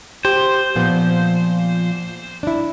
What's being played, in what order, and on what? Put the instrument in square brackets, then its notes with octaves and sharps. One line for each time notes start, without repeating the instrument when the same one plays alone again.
[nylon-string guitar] G4 [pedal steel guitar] C5
[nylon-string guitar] A#2 F3 B3
D4 E4